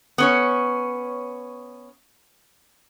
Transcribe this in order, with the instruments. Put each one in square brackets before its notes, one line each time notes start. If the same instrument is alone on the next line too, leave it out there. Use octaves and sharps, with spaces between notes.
[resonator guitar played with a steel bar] B3 C#4 C#5